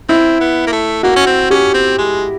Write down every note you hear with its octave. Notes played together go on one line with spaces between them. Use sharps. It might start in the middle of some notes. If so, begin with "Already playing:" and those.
C4 E4
B3
A#3
A3
A#3 F#4
C#4
C4
C#4 G4
C4
G#3